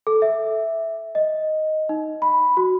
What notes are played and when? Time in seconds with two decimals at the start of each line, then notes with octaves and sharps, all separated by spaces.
0.07 A4
0.22 E5
1.15 D#5
1.89 D#4
2.22 B5
2.57 F#4